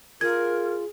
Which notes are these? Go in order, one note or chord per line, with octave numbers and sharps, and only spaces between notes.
F4 G#4 A#4 G#6